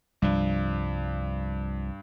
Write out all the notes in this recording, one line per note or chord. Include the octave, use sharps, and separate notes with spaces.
C2 G2 F3